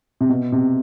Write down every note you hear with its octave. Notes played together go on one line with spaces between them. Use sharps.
C3
B2
C3